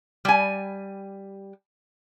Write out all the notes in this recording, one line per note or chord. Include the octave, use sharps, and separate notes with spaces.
G3 G#5